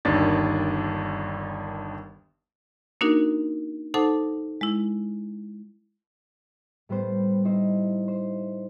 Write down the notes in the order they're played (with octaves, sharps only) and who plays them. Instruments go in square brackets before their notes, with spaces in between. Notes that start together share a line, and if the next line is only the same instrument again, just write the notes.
[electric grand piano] G1 D#2 D#3 D4 A6
[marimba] A#3 D4 D#4 F#4 A#4
D#4 A4 C5 F#5 A5 D6
G#3 E4
[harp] A2 G3 B3 C5
D#4 E4 C5
C5